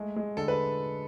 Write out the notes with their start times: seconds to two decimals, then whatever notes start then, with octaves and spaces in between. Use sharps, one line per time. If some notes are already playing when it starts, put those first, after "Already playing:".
Already playing: G#3 A3
0.16 G#3
0.37 D3 A4
0.48 B4